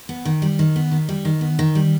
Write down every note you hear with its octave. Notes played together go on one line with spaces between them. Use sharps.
B3
D#3
G3
D#3
B3
D#3
G3
D#3
B3
D#3
G3